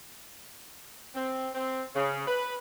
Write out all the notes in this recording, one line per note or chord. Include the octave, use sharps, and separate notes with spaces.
C4
C4
C#3
B4